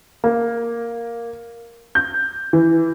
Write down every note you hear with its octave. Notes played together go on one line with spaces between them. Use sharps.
A#3
G6
E3